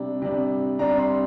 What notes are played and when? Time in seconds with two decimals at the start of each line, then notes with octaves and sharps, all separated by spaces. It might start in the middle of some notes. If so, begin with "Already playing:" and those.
Already playing: C3 G3 D4
0.22 C3 G3 D4
0.79 C3 G3 D4 A#5
0.99 C6